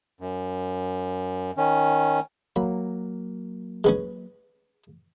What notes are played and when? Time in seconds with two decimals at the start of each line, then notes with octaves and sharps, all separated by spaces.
0.20 F#2
1.57 D#3 C#4
2.56 F#3 A#3 B5
3.84 G#3 B3 C#4